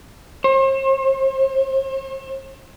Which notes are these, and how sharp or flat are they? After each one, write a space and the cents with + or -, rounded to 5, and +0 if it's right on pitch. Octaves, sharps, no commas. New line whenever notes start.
C5 +45